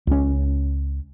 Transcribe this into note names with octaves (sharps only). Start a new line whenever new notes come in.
C#2 C#4